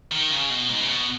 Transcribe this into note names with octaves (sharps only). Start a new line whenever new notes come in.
D#3
C#3
B2
G#2
C#3
B2